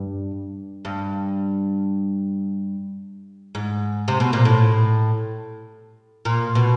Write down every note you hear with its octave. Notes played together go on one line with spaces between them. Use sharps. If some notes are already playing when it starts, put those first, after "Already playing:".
Already playing: G2
G2
G#2
C3
B2
A#2
A2
A#2
B2